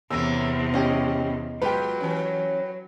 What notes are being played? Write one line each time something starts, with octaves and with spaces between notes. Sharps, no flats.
E2 C3 E3 A#3 C#4 E6
C#4 G4 D#5
F#3 G#3 F4 G4 B4 G5
E3 C#4